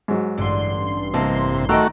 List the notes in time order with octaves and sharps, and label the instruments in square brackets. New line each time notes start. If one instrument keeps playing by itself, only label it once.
[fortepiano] G#2 F#3
[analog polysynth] A1 G2 C6 [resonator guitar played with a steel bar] D3
[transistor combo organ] C3 [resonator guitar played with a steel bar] E3 A#3 [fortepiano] D#5 A5
[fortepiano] D#3 E6 [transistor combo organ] A3 F#4 [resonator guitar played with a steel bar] D#5 G5 A#5